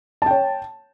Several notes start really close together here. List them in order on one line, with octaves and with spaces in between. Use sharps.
A5 G5 C#5